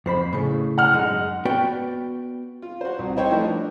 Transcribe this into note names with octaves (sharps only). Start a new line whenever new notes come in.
F2 C5 B5
A2 C#3
F#5 F6
F#2 G#3 D#4
B3 F#4 B4 D5 G5
F4
F#4 C5
C2
D#4 E4 C5 C#5 G5
F3 A3 D#4 B4 D#5
D4